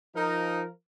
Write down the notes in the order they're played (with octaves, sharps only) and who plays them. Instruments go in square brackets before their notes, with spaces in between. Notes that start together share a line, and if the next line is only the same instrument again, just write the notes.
[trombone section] F3 A#4 [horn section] D#4